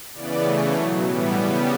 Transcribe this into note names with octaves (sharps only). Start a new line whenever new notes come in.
C#3 E3 B3 D5
C#3 E3 A3
B2 F#3 A3 C#5
A2 E3 G3 B3 B4
C#3 G3 B3 A4